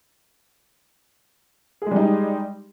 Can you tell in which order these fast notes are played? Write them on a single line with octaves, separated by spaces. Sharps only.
G#4 G#3 G3 D#4